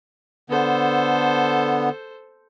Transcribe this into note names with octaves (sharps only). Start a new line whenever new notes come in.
D3 B3 A4 C5